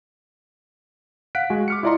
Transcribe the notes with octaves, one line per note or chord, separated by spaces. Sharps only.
F5 F#5 F#6 B6 D7
G#3 F#4 G#5
D6 F6 C#7
E4 F4 D5 D#5 A#5 C6